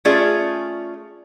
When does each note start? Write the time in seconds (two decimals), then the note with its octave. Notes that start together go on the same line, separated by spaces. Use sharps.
0.05 A3 C#4 F4 G#4 D5